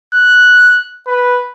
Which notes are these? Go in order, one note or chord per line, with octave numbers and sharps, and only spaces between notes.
F#6
B4